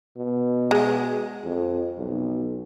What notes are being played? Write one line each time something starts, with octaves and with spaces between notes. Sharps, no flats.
B2
G#3
F2
B1